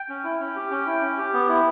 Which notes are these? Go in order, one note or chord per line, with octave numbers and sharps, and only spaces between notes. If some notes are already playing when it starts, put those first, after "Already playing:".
Already playing: G5
C#4
E4
C#4
G4
C#4
E4
C#4
G4
B3
E4